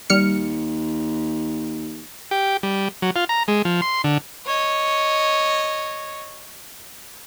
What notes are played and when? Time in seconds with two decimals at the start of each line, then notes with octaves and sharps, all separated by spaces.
0.10 D#2 G3 F6 C#7
2.31 G4
2.63 G3
3.02 F#3
3.16 F4
3.29 A#5
3.48 G#3
3.65 F3
3.82 C6
4.04 D3
4.46 C#5 D#5